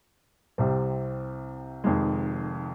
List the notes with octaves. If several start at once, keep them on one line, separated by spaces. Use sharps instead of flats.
C2 C3 G3 C4
F1 F2 D#3 G#3